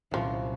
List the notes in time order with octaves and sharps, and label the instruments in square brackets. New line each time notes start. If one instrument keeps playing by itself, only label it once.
[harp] C2 A#2 F#3 A#3 C#4 [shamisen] F3